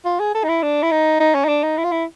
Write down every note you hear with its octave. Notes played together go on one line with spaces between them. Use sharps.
F4
G#4
A4
D#4
E4
D4
E4
D#4
D#4
C#4
D#4
D4
D#4
E4
F4
E4